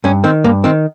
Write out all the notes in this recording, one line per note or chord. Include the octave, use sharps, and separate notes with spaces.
G2 C#4
D#3 C4
G2 A#3
D#3 C4